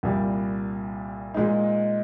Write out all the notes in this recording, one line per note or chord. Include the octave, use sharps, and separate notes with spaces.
C2 A#2 G3
A#2 G#3 D#4